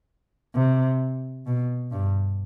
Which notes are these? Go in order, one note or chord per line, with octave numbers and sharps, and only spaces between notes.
C3
B2
G2